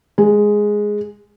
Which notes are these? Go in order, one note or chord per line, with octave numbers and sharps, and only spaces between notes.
G#3